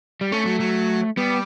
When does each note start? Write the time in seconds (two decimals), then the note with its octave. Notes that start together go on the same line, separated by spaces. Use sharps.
0.21 G3
0.32 A3 C#4
0.45 F#3
0.60 F#3
1.17 G3 B3